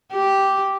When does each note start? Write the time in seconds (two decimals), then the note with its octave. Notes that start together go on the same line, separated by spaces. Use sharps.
0.13 G4